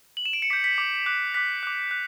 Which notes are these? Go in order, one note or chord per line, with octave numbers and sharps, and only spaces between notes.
F#7
E7
D7
C#7
D6 G6 B6
B6
D6 G6
D6 F#6
D6 F#6 B6
D6 F#6
F#6